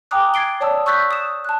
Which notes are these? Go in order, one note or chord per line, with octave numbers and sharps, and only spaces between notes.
G5 G#5 A#5 D6 D#6 F#6
G#6 A6 C7 D7 G7
C#5 D5 A5 D#6 E6
C#6 E6 F#6 G6 A6 B6
D#6 E7
A5 F#6